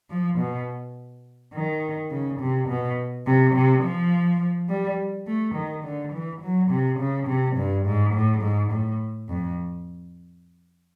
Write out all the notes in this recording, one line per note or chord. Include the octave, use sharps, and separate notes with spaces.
F3
B2
D#3
C#3
C3
B2
C3
C3
F3
G3
A3
D#3
D3
E3
F#3
C3
C#3
C3
G2
G#2
A2
G#2
A2
F2